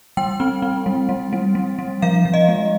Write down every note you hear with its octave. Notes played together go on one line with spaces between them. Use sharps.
G3 G5
C4
C4
G3
G3
G3
G3
G3
F3 F5
F3
D#5
G#3